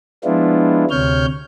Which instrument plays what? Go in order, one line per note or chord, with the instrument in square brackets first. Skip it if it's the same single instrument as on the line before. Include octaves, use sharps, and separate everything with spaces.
[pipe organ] F3 G#3 B3 D4 E4 F4
D2 C3 C#5 F6 G6